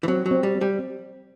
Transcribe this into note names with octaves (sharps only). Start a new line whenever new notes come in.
E3
F#3 C4
F#3
C4
G3
C4
G3
C4